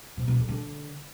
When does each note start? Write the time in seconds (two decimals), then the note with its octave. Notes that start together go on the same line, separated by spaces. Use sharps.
0.17 C3
0.28 B2
0.38 D3
0.49 D3